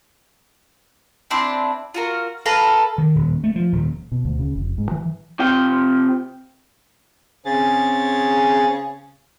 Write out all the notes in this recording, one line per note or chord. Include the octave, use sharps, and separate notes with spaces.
C4 D4 E4 C6
F4 F#4 A#4
A4 B4 F5 A#5
D#3
D#1
A3
F3
D#1
B2
D2
C#3
F1
G#2
E3
C3 F4 G5
C#3 C4 G#4 A6